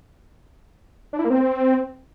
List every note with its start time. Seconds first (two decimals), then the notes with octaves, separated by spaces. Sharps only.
1.13 D4
1.19 E4
1.24 A#3
1.30 C4